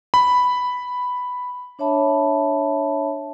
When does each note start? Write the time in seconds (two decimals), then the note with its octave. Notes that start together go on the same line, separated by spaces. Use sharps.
0.14 B5
1.79 D4 C#5 E5 A5 B5